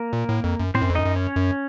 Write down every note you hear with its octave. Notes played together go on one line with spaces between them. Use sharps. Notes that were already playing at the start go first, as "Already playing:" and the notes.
Already playing: A#3 A#4
A#2
A2
F2
F#2
A2 C4 C5
F#2
F2
F#2 D#4 D#5
F#2
C#4 C#5
F#2